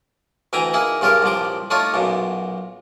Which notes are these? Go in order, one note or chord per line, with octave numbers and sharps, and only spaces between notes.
D2 E3 E5 G5 G#5 A#5
A#3 D#4 E4 G#4
G2 C#3 F4 G4 A#4
C2 A#2 F3 D6
A3 D4 D#4 F4 C#5
B1 F#2 A#2